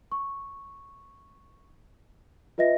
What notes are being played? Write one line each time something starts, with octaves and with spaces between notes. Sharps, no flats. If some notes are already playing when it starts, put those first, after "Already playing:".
C#6
F4 B4 D#5 E5 A#6